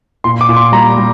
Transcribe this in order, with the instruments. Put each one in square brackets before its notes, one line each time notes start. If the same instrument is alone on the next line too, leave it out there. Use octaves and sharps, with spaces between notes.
[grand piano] A#2 [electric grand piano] C6
[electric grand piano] D6
[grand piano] A#2
[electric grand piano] C6
[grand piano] G3 [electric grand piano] A#5
[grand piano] G3